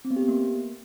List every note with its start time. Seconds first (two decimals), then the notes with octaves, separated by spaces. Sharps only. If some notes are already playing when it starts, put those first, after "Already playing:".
0.05 C4
0.11 B3
0.16 G4
0.22 B3
0.28 A#3